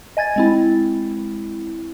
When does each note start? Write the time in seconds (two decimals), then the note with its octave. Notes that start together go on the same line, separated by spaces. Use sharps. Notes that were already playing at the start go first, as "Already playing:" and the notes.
0.17 D#5 G#5 G#6 A6
0.36 G#3 C4 E4